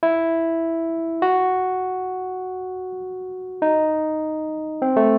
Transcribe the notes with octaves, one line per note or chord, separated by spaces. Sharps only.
E4
F#4
D#4
C4
A3